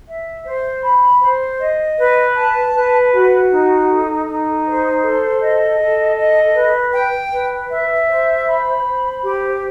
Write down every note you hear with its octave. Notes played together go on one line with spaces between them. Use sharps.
E5
C5
B5
C5
D#5
B4
A5
B4
F#4
D#4
A4
D#4
C5
A4
D#5
A4
D#5
B4
G5
B4
E5
C5
B5
C5
G4